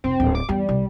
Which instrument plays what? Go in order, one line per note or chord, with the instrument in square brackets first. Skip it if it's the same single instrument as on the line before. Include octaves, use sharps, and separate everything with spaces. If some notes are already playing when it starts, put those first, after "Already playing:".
[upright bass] F1 [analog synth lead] C4
[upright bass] D1
[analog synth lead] D6
[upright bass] E2 [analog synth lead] G3
[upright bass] C2